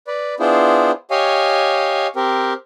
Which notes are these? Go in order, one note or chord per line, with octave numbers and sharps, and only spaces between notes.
B4 D5
B3 D4 E4 F4 G#4 C5
G4 C#5 D#5 F5 G#5
C4 G4 A#4